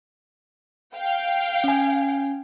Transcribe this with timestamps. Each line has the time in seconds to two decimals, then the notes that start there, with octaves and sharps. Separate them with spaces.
0.96 F5 G5
1.64 C#4 G#5